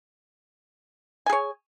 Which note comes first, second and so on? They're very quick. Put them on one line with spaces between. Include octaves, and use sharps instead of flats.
G#5 G#4 C#5